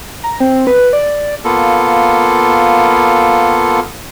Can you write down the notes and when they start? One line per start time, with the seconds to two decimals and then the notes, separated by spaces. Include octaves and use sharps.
0.24 A#5
0.40 C4
0.67 B4
0.93 D5
1.44 A#3 B3 F4 A4